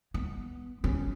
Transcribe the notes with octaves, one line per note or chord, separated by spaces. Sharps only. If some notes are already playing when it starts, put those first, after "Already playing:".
B3
C#4